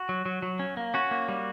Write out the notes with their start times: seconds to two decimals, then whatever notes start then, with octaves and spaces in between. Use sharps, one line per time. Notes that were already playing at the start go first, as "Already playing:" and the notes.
Already playing: F#4
0.09 F#3
0.26 F#3
0.42 F#3
0.59 C#4
0.77 A#3
0.94 C#4 F#4
1.11 A#3
1.28 G3